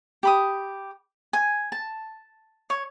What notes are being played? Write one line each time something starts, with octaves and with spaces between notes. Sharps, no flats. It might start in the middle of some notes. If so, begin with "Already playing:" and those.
G4 B5 D#6
G#5
A5
C#5